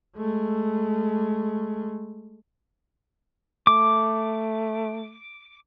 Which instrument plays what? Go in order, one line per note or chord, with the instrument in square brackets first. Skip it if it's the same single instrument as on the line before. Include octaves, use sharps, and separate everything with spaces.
[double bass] G#3 A3
[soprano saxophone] A3 [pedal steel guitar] D6